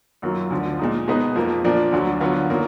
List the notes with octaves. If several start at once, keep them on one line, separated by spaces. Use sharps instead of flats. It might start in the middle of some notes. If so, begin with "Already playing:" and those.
F#2 D#3 F#3 A#3 F4
D2 D3 F3
A#2 G#3 D#4
B2 G#3 B3 D#4
F2 F3 A#3
A#2 F3 A#3 D4 F4
D2 D3 F#3
D3 F#3 B3 F4
D#3 F#3 A#3 F4